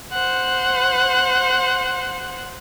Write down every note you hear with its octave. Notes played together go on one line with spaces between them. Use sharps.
C5 F#5